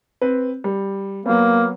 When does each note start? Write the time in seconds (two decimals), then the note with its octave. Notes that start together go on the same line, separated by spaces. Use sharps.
0.21 C4 B4
0.64 G3
1.26 F#3 A#3 B3